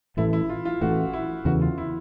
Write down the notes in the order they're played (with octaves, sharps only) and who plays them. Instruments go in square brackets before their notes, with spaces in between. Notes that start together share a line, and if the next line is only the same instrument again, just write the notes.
[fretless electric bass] A1 A2 E3 A3 [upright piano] E4
[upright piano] E4
F4
F4
[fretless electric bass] A1 A2 E3 A3 [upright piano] F#4
[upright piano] E4
[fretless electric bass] E2 C#3 E3 A3 [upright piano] F#4
[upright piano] F4
E4